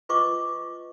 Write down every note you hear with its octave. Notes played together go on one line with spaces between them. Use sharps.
F4 B4 D#5 C#6 D6